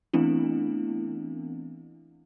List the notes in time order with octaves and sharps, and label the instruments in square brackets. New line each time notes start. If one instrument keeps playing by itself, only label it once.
[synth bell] E3 A3 B3 C4 D4 E4